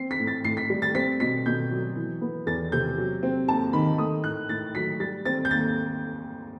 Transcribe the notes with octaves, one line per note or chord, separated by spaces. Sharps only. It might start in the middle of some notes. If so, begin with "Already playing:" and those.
Already playing: C4 C7
B6
A2
A6
A2 C7
B6
G3
A6
C4 B6
B2 B6
B2 G6
F#3
E3
B3
E2 A6
C3 G6
F#3
C4
D#2 A5
D#3 B5
A3 D#6
A2 F#6
A2 A6
F#3 B6
G3 A6
C4 A6
G6
D#2 A6